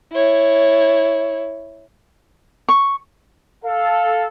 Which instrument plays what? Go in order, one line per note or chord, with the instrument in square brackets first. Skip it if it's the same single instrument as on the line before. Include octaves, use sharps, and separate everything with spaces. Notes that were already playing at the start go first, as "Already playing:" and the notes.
[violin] E4 C#5
[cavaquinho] C#6
[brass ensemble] A4 F5